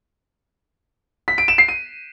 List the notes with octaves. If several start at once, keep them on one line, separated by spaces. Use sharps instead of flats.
B6
D7
E7
C7
D#7